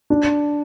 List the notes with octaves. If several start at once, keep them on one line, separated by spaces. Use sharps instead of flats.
D4